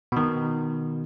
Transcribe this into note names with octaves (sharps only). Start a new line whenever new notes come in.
B2 D#3